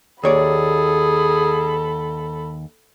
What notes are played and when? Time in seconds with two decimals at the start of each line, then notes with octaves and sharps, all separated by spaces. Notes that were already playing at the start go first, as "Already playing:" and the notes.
0.23 D#2 G#4 A4 C#5 D5 B5